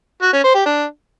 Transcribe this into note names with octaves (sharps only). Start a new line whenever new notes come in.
F#4
C#4
C5
G4
D4